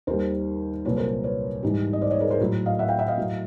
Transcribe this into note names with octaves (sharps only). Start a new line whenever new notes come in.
D#2 D#3 G3 A#4 C5
C2 A#2 F#3 B4 C#5
A#4 C5
B4 C#5
G#2 E3 G3
D#5
C5 D5
C#5 D#5
G#4 A#4
A#4 C5
A2 F#3
D#5 F5
E5 F#5
F5 G5
E5 F#5
D#5 F5
A2 F#3